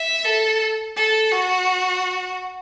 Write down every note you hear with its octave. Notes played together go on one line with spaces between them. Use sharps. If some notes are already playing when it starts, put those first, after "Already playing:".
Already playing: E5
A4
A4
F#4